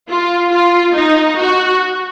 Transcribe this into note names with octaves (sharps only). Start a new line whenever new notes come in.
F4
F4
D#4
F#4